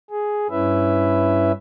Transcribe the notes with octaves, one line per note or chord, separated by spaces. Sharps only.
G#4
G2 C#4 E4 B4 E5